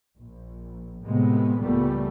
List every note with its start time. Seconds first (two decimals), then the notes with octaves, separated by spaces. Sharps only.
0.18 A#1
1.03 A2 C3 G#3 B3
1.59 C#2 A#2 E3 G3 A3 B3